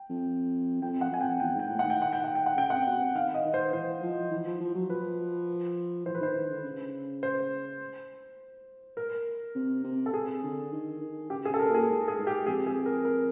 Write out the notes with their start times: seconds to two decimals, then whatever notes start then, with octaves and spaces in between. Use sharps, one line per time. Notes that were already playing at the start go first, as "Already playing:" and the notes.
Already playing: G5
0.09 F2
0.82 F2 G5
1.01 F#5
1.11 F2 G#5
1.21 G5
1.40 E2 G5
1.55 G#2 G5
1.69 A2
1.79 D#3 F#5
1.90 G5
2.02 F#5
2.13 G5
2.24 F#5
2.35 G5
2.46 F#5
2.56 C#3 G5
2.70 C3 F#5
2.86 B2
3.00 C3
3.14 D#3 F5
3.34 D#5
3.45 D#3
3.54 C5
3.73 E3 C5
4.02 F3
4.31 E3
4.46 F3
4.60 F3
4.74 F#3
4.89 F3 B4
6.06 E3 C5
6.15 B4
6.21 D#3 C5
6.35 D#3
6.50 D3
6.64 C#3
7.23 C5
8.97 A#4
9.55 C3
9.84 C3
10.06 A4
10.13 C3 G#4
10.43 D3
10.73 D#3
11.01 D#3
11.30 C#3 G4
11.45 G#4
11.50 C#3 A4
11.59 A#4
11.70 A#2 G#4
11.89 G#2
12.08 G#4
12.18 G#2
12.27 G4
12.46 F2 G#4
12.67 G#4
12.86 A#4
13.05 A#4